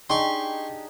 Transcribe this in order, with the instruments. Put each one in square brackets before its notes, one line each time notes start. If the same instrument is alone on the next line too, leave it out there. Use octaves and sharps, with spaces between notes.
[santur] D4 D#4 G#4 [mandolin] G4 [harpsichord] C6 C#6